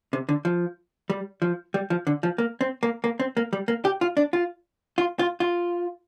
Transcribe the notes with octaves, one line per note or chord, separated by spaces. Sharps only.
C3
D3
F3
G3
F3
G3
F3
D3
F3
A#3
C4
A#3
A#3
C4
A#3
G3
A#3
G4
F4
D4
F4
F4
F4
F4